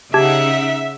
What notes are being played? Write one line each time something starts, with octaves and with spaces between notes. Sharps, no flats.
C#3 D#4 G4 E5 F#5 A5 G#6